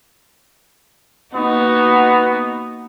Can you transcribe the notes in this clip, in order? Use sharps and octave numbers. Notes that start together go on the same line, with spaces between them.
A#3 B3 D#4 F#4